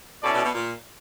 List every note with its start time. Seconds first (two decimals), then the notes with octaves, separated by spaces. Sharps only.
0.23 B2 C#4 E4 A4 D5
0.33 B2
0.44 B2
0.54 A#2